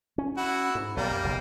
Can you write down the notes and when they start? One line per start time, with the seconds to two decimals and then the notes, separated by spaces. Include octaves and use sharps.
0.18 C#4
0.37 E4 F#4
0.75 G#2
0.97 B1 G3 A#3
1.11 F#2
1.24 F#1 B1